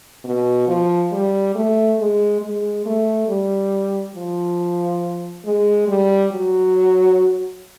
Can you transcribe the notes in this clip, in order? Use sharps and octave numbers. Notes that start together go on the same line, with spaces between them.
B2
F3
G3
A3
G#3
G#3
A3
G3
F3
G#3
G3
F#3